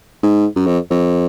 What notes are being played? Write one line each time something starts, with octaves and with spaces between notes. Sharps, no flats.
G#2
F#2
F2
F2